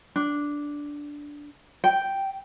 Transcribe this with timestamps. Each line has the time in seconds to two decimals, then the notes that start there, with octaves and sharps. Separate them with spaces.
0.16 D4
1.84 G5